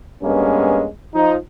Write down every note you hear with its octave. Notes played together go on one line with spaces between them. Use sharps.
G2 G#3 A#3 B3 C#4
F3 D#4